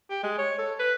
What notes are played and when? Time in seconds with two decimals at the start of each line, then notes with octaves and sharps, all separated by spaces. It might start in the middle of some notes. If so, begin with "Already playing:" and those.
0.10 G4
0.23 G#3
0.38 C#5
0.58 A4
0.79 B4